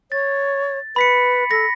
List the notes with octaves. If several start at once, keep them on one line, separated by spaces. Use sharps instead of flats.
C#5 A6
B4 B5 B6 C#7
A4 A#6